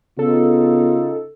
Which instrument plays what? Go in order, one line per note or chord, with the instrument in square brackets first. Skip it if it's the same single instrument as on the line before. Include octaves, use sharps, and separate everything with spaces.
[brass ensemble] C#3 D#4 F4 [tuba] B3 [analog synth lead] A4